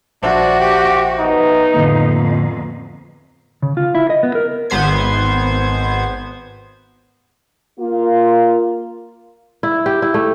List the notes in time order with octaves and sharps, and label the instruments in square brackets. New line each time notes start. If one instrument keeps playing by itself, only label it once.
[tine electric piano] A#1 C5 E5 [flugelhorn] D4 [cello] F#4 [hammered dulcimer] A5 C6 D6
[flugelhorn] G4 [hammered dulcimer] F5
[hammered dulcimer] E3 B3 A4 [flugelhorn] D#4
[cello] F2 [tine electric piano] A2 D3 A#3
[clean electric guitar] C#3
F4
E4
D#5
B3
A#4
[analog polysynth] G#1 B3 C5 G#6
[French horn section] A#3 F4
[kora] E4
G4
E4
A3